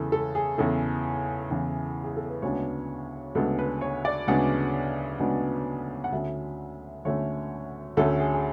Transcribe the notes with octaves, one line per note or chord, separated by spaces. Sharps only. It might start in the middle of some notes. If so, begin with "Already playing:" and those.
Already playing: E2 C#3 E3 A4
A4
G#4
E2 C#3 E3 A4
E2 C#3 E3
G#4
A4
B4
D2 C#3 G#3 B3 D4 C#5
D2 C#3 G#3 B3 D4 A4
B4
C#5
D5
D2 C#3 G#3 B3 D4 F#5
D2 C#3 G#3 B3 D4
F#5
D2 D3 A3 C#4 E5
D2 D3 A3 C#4 C#5
D2 D3 A3 C#4 A4
G#4
G#4